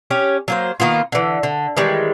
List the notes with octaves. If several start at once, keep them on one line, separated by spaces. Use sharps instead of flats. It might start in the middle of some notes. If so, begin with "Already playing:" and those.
C#4 G4 C#5
F#3 A#3 C5
D#3 A#3 B3 F4
D3 E3
D3
D#3 E3 G3 G#3